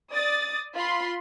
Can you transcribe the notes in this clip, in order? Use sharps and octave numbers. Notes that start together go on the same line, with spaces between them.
D5 D#6 A6
F4 B5 C6